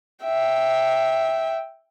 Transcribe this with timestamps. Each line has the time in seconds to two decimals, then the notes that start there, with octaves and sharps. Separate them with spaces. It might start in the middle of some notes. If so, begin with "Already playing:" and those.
0.23 E5 G5